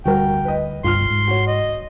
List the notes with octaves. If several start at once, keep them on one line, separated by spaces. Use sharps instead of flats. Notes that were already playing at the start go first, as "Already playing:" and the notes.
D2 G3 F#4 A#4 G5
B4 D#5
G1 C2 G2 F4 C6 F6
G#2
F#4 C#5
D#5